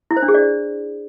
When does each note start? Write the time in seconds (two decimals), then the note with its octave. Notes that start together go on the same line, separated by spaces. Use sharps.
0.11 E4
0.17 C5
0.22 D4
0.28 G#4
0.34 D5